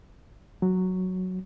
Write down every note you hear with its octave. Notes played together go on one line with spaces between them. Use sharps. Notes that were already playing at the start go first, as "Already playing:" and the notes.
F#3